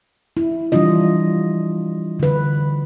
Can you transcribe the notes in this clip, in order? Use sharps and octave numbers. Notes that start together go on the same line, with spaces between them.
E4
E3 G3 D4 F4 D#5
D3 B4